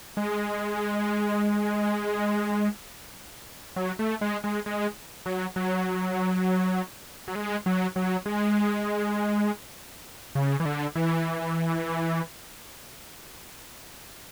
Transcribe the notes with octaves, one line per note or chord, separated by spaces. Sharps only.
G#3
F#3
A3
G#3
G#3
G#3
F#3
F#3
F#3
G#3
F#3
F#3
G#3
C#3
E3
D3
E3